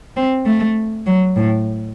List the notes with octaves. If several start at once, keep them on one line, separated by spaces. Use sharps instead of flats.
C4
A3
F#3
A2